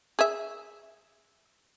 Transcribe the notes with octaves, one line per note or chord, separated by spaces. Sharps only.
G#4 E5